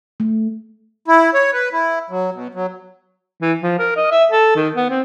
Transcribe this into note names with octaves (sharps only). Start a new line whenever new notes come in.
A3
E4
C#5
B4
E4
F#3
B2
F#3
E3
F3
A#4
D#5
E5
A4
D#3
B3
C4